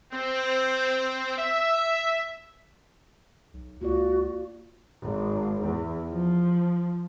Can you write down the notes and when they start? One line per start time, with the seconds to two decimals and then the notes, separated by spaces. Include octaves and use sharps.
0.12 C4
1.37 E5
3.53 B1
3.81 C#2 A#3 F4 F#4 D5
5.02 G#1
5.61 E2
6.12 F3